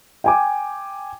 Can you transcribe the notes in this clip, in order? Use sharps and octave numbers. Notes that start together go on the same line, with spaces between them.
G5 G#5 D6